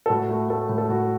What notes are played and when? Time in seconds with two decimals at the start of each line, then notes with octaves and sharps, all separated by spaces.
0.06 A4
0.10 A2 F#4
0.29 A3
0.49 A3 A4
0.69 A2
0.78 A4
0.89 A2 F#4